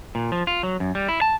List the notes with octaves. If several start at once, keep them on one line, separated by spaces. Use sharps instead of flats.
A#2
F3
F4
F#3
F#2
G3
E4
A5